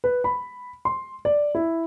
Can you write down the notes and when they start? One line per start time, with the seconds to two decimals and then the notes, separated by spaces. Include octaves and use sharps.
0.04 B4
0.24 B5
0.85 C6
1.25 D5
1.55 E4